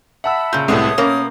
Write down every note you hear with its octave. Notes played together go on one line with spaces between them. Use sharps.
E5 F#5 A5 B5 E6
A#2 C#3 G6
C2 A2 G#3 A3 B3 A4 C#5 D#6
B2 A#3 C#4